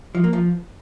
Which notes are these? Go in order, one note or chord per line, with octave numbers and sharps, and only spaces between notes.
F3
A#3
F3